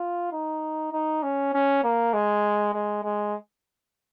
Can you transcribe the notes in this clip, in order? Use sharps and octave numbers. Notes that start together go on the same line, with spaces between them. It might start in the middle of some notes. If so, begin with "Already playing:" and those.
Already playing: F4
D#4
D#4
C#4
C#4
A#3
G#3
G#3
G#3